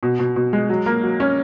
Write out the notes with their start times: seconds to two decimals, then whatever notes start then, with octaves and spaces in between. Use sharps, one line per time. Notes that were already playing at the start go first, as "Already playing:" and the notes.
0.03 B2
0.19 B2
0.36 B2
0.53 G#3
0.70 F#3
0.86 A#3
1.03 F#3
1.20 C#4